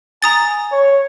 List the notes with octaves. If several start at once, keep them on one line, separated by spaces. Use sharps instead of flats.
G#5 A#5 D#6 A6
C#5